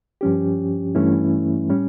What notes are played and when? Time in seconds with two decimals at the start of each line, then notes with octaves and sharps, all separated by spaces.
0.21 G2 F3 C#4 G4
0.95 G2 E3 A3 C#4 E4
1.69 A2 G3 C#4